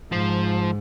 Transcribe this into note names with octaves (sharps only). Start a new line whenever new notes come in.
G#2 F3